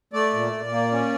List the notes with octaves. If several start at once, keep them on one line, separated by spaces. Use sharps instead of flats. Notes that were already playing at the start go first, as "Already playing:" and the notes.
A3 D5
A#2
A#2
A#3
C#4